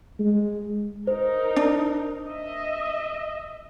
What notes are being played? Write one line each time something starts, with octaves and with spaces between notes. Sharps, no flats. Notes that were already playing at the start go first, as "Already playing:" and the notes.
G#3
D#4 A#4 C5
D4
D#5 E5